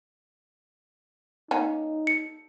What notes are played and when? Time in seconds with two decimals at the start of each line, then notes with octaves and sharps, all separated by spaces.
1.51 A#3 C#4 D#4
2.07 C#7